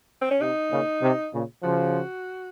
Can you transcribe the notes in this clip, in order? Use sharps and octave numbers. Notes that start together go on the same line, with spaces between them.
C4
C#4
C3 D#4
A#2 C#3
C3
A#2 C#3
C#3 F3 F#4